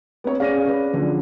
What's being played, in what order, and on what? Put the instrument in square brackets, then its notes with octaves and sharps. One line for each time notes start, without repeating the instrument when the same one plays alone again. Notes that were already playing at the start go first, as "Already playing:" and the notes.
[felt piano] B3 C4 C#5
[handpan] C#4 G#4 D5 [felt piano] F5 A#6 D#7
[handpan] C#4 B4
[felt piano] D3 F3 [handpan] F#3